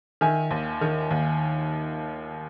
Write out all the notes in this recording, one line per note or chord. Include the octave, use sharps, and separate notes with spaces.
D#3 E5 G#5
D#2
D#3
D#2